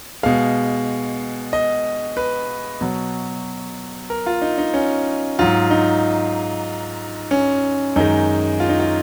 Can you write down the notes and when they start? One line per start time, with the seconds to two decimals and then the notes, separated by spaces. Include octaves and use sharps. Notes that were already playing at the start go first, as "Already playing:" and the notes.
0.23 B2 G#3 F5
1.53 D#5
2.17 B4
2.81 B2 F#3
4.10 A#4
4.26 F4
4.42 D#4
4.58 D#4
4.74 C#4
5.39 G#2 F#3 F4
5.71 D#4
7.31 C#4
7.96 F#2 D#3 G#3 D#4
8.60 F4
8.69 D#4
8.80 F4